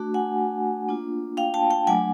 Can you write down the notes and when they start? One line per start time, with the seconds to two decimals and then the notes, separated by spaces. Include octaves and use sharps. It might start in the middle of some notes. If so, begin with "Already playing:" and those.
Already playing: A3 D4 F#4
0.14 F#5 G#5
0.88 A#3 D4 F4
1.37 F5 G5
1.54 G5 A5
1.71 G5 A5
1.87 F#3 A3 D4 F#5 G#5